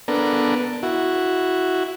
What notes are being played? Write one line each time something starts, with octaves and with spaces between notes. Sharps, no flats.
B3 D4 A4 A#4
E4 F#4